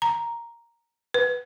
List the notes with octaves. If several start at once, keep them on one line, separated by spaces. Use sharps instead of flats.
A#5
B4